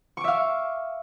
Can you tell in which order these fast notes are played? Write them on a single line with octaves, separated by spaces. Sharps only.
C#6 D6 E5 F5